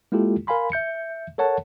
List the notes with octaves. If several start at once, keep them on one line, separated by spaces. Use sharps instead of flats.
G#3 A#3 E4 F4 G4 A4
A#4 F5 G#5 B5 C6
E5 G6 C#7
A4 A#4 C#5 F#5 A5